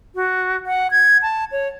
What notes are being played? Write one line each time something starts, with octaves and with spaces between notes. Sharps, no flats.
F#4
F#5
G#6
A5
C#5